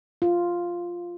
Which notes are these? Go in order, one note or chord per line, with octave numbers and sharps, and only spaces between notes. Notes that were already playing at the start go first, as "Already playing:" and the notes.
F4